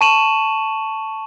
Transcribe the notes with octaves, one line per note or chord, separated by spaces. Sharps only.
A5 C#6 D#7 E7 F#7